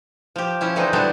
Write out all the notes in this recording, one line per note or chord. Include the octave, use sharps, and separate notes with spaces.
F3 G4
F3 C#4 E4
D3 E3 G#3 A3 C4 D#4
D3 F#3 G3 B3 D4 E4